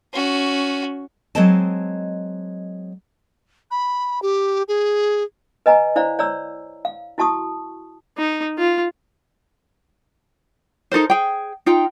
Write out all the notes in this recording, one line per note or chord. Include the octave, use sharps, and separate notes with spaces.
C#4 F#4
F#3 G#3 C4 D#5 A5
B5
G4
G#4
B4 D#5 G#5 A#5
E4 C5 D5 F5 A#5
C#5 D5 A#5 E6
F5
E4 F#4 A5 C#6 D#6
D#4
F4
D#4 A4 A#4 C5
G#4 G5
D#4 F4 G5